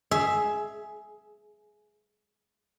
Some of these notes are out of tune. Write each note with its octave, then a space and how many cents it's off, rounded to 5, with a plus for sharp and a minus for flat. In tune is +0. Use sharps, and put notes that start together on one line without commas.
G#4 +15 E5 +0